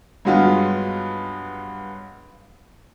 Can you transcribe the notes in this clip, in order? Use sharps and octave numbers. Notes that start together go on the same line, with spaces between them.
G2 F#3 G#3 B3 F4